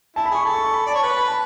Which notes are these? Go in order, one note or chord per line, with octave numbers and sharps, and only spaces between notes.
E4 A5
B5
G#4 C#6
A4 B5
C#6
C#6
B5
D5 A5
C#5
B4 C#6
B5
A5